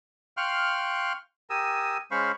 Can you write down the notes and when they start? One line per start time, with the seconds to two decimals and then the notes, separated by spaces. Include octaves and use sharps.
0.37 F5 G5 C6 C#6 F6 F#6
1.50 G4 A#4 G#5 D#6 E6
2.11 G#3 C#4 C5 F5 B5 C#6